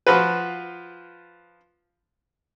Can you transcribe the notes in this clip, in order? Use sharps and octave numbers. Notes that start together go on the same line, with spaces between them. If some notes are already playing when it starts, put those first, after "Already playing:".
F3 F4 F#4 B4